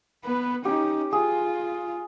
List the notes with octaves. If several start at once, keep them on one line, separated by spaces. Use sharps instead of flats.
B3 B4
C#4 D#4 G4
F4 G#4